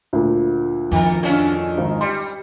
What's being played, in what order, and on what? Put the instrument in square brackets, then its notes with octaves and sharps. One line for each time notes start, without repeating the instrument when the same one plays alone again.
[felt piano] D2 A#2
[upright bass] F2 [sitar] D#3 A#4
[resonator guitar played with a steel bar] D3 D4 F4 [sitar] D#3 C#4
[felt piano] G#1 D#4
[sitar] G3 [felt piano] C6